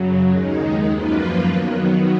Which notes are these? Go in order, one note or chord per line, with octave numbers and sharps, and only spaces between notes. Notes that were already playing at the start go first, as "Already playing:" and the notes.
Already playing: F#2 C#3 F#3
D#2 D#3 G#3 D#4
F#2 F3 A#3 F4 B4
D#3 F#3 B3